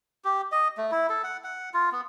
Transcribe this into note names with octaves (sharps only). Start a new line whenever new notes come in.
G4
D#5
A3
E4
A4
F#5
F#5
F4
B3